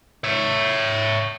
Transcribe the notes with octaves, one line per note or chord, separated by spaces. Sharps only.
C#5 E5